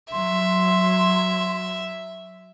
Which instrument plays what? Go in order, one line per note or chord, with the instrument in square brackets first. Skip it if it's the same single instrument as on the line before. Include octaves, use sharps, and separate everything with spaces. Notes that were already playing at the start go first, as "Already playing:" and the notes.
[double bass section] F#3 [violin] E5 [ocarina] C6